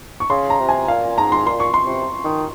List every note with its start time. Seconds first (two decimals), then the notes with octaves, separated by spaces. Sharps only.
0.20 C#6
0.30 C#3 C6
0.50 A#5
0.59 C3
0.69 G#5
0.88 A#2 F5
1.18 G#2 A#5
1.32 C6
1.47 A#2 C6
1.60 C#6
1.74 C6
1.86 C3
2.24 D#3